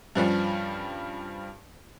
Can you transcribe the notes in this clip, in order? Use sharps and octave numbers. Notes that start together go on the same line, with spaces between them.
G2 F3 G3 C#4